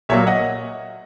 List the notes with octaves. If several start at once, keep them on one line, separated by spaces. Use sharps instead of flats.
A#2 F#3 A#3 C#5 E5
D#5 F#5